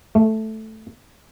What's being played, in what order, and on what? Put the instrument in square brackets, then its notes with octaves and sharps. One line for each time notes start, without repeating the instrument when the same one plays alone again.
[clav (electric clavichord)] A3